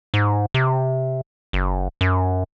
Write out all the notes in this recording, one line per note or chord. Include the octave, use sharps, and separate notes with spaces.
G#2
C3
F#1
F#2